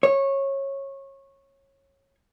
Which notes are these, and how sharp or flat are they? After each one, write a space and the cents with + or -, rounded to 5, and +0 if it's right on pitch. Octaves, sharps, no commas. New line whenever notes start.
C#5 -20